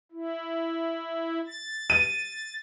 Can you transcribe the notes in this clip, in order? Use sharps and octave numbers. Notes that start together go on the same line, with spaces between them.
E4
A6
D#7